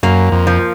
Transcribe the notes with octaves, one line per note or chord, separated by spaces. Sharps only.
F#2 A#3
F2
F3